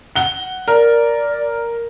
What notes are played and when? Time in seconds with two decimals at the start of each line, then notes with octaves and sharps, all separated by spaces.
0.16 F#5 G7
0.68 A#4 D5